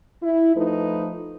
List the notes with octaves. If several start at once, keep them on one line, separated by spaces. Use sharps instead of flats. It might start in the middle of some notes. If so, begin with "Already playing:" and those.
E4
F3 A3 D#4 B4